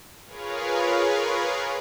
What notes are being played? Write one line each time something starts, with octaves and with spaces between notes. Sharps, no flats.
F4 G#4 A#4 B4 C#5 F5